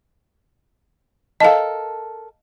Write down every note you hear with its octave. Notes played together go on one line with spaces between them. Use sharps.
A4 A#4 D#5 F5 A5